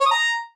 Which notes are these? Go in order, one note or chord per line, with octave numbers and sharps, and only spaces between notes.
C#5
D#6
A#5